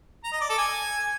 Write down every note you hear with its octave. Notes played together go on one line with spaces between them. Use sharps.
A#5
D#5
D5
A4
G#5